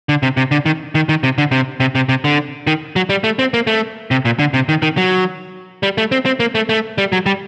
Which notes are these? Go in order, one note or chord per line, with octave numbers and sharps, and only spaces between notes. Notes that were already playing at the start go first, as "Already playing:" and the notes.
D3
C3
C3
D3
D#3
D#3
D#3
C3
D3
C3
C3
C3
C3
D3
D#3
F#3
G3
A3
C4
A#3
A3
C3
A#2
D3
C3
D#3
D#3
F#3
G3
A3
C4
C4
A#3
A3
A3
G3
F#3
G3